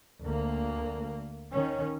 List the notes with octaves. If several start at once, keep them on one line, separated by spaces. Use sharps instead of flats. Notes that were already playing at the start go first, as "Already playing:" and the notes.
D2 A#3
D#3 C#4